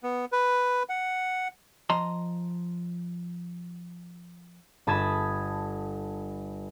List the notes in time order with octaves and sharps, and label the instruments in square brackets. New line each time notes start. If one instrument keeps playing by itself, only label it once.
[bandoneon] B3
B4
F#5
[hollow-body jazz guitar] F3 D#5 A#5 C6
[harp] G1 A5 B5 D#6 G#6 E7